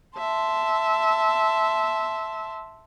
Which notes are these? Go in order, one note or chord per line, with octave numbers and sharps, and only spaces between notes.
E5 A5 C6